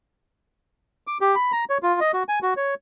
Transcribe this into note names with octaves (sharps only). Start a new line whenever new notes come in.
D6
G4
B5
A#5
C#5
F4
D#5
F#4
G#5
F#4
C#5